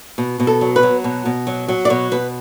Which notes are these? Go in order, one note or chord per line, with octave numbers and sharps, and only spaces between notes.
B2
B2
A4
F#3
B4
F#3
B2
B2
F#3
F#3
D5
B2 C#5
B2 B4